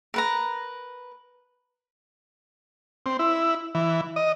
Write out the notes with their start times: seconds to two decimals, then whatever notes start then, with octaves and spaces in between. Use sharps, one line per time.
0.14 A#4 B4 A#5
3.06 C4
3.19 E4
3.75 E3
4.16 D#5